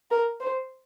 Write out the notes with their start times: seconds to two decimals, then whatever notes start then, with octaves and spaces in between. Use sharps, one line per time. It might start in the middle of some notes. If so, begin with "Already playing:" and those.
0.11 A#4
0.40 C5